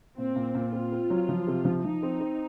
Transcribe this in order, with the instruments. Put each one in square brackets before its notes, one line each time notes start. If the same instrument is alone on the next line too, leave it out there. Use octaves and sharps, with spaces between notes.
[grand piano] A#2 [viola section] C4
[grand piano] A#2
A#2
[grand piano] C4 [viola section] F4
[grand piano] C4
F#3
F3
C3
F3
[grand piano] F3 [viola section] D#4
[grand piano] C4
C4